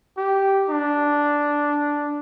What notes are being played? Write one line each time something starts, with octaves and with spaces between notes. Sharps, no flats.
G4
D4